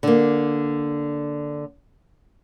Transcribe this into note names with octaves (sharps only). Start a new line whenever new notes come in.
D3 A#3